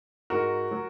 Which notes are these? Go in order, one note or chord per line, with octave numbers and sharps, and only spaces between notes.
G#2 F#4 A#4
F#3